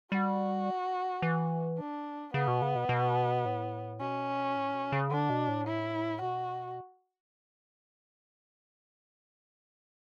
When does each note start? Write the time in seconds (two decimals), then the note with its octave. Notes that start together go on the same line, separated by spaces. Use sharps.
0.12 G3 F#4
1.22 E3
1.78 D4
2.34 C#3 B3
2.48 B2
2.62 C#3
2.75 B2
2.89 B2
3.45 A2
4.00 B2 C#4
4.56 A2
4.74 B2
4.92 C#3
5.11 D3 D4
5.30 B2
5.48 A2
5.67 E4
6.22 B2 F#4